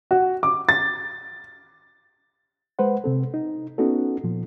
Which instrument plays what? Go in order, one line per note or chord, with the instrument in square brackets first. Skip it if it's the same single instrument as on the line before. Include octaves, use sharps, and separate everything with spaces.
[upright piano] F#4
D6
A6
[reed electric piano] G#3 B4 C5 F#5
C3 C4 A4
D#4
B3 C#4 D#4 F#4 A4
A#2 F3